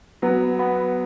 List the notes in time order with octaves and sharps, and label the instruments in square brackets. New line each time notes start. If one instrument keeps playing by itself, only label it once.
[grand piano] F#3 [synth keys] B3
[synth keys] B3